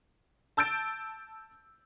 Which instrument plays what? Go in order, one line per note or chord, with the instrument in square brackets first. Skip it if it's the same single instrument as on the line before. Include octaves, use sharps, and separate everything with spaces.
[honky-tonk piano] A5 E6 G6 A6 D7